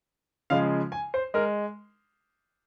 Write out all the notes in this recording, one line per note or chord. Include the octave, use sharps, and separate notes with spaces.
C#3 F3 G#3 F5
G#5
C5
G#3 A#4